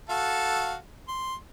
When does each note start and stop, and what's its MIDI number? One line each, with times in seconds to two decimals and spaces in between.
0.09 0.75 66
0.09 0.75 69
0.09 0.75 77
1.08 1.34 84